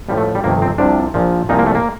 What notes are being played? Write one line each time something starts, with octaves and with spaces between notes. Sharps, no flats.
A1 A2 F3 G3
A3
G3
G1 F2 C3 D#3 A#3
C4
C2 C3 F3 D4
A#1 A#2 F3
C2 A#2 F3 D#4
A#3
A3
A#3